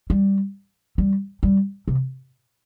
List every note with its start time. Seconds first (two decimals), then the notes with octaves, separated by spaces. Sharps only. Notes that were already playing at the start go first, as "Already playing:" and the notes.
0.10 G3
0.98 G3
1.43 G3
1.88 C3